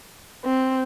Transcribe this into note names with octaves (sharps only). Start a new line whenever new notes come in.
C4